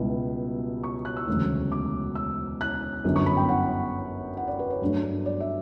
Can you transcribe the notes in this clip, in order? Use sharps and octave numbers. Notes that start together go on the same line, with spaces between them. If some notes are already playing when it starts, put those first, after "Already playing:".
Already playing: C#2 B2 G3 E4
C#6
F#6
E6
E1 D2 C#3 F#3 A3
D6
E6
F#6
G1 F#2 D3
C#6
B5
G5
F#5
F#5
D5
B4
C#5
G2 F#3 A3 D4
D5
E5